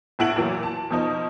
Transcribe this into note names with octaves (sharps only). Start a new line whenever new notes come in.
A#1 A2 E4 F#5 D7 F#7
A#2 E3 F#3
A5
B2 F3 D#4